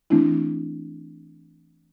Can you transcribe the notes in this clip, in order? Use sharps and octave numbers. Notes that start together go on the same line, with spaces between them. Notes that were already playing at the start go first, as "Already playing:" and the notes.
E3 A3 C4 D4 E4